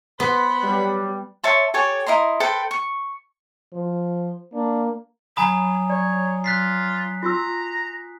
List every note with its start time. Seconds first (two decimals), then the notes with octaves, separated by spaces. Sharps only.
0.20 B3 B4 C5 F#5 B5
0.64 F#3 G3
1.43 C#5 E5 A5 C6
1.74 G4 A4 C#5 G#5
2.06 E4 D#5 A#5 C6
2.40 A4 B4 C5 G5
2.71 C#6
3.74 F3 C5
4.54 A#3 D4
5.37 F#3 G#5 A#5 B5 D#6
5.90 C#5 D5
6.44 F4 F#6 B6 C7
7.23 F4 F#4 A#5 E6